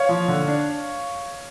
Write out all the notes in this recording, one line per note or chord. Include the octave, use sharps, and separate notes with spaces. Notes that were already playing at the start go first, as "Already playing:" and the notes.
Already playing: C#5 F5
F3
D3
D4